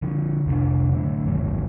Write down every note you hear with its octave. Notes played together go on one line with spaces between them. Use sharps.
D3 F3
F1 C2 B2 D4
A2 D3
G1 D#2 D#3 F#3